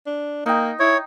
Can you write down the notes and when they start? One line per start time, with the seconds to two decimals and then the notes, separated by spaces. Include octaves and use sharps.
0.07 D4
0.46 A#3 D#4 G5
0.80 E4 C#5